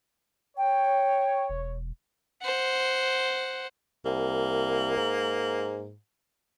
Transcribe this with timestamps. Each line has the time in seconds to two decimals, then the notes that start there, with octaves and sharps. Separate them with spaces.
0.58 C#5 G5
1.50 E1
2.42 C5 F#5
4.05 C2 A#3
4.97 G#2